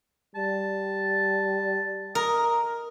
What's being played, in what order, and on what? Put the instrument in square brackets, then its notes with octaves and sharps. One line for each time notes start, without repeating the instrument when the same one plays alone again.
[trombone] G3 [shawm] A5
[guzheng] A#4 [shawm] D#5